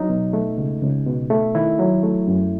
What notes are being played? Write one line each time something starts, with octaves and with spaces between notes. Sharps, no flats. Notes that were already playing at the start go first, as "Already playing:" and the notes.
Already playing: F#3 D#4
B2
A3
C#2
C#2
B2
A3
D#3 E4
F#3
A3
F#2